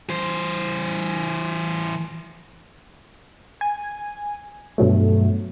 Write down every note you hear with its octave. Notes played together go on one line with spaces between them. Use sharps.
E3 C5
G#5
G2 B2 F#3 A3